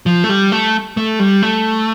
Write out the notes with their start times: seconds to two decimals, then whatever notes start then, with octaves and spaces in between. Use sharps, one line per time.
0.06 F3
0.24 A3
0.29 G3
0.52 A3
0.97 A3
1.19 G3
1.42 A3